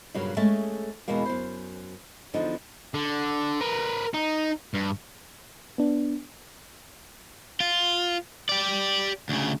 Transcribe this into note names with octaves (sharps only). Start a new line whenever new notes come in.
G2 A#2 C#3 F#3
G#3 A3 C#4 G#4 E5 A5
E2 B2 G#3 A#3
F#2 C5
E2 D3 F3 D#4
D3
A#4 B4
D#4
G2
B3 D4
F4
G4 D5
D2 C#3